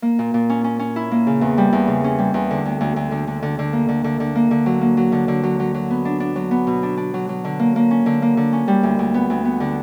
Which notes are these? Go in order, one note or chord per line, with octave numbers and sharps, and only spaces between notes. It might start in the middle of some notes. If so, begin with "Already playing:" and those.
A#3
A#2
A#2
C#4
C#4
C#4
E4
A#3
C#3
E2
G3
E2
C#3
C#4
G3
E2
D3
D2
D2
D2
D3
D3
D3
D3
A#3
D3
D3
D3
A#3
D3
F#3
A#3
F#3
D3
D3
F#3
F#3
F#3
B3
D4
D4
F#3
B3
B2
D4
D4
F#3
F#3
D3
A#3
A#3
C#4
D3
A#3
D3
C#4
G3
D2
D2
B3
D2
B3
D3